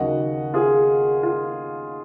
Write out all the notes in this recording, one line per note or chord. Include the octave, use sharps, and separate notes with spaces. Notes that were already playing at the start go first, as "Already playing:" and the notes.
Already playing: D#2 C#3 F#3 A#3 D#5 F#5
F4 G#4
F4